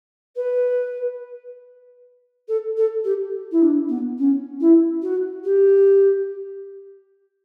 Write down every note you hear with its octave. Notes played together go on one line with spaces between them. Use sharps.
B4
A4
A4
G4
E4
D4
B3
C#4
E4
F#4
G4